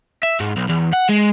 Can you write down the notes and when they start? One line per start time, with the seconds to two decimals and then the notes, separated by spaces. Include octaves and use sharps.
0.23 E5
0.40 G#2
0.57 B1
0.69 E2
0.93 F#5
1.09 G#3